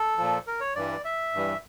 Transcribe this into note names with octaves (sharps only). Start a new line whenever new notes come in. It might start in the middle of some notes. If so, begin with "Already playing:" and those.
Already playing: A4
A#2 F3
A#4
C#5
G2 E3 G3 D5
E5
G2 E3 G3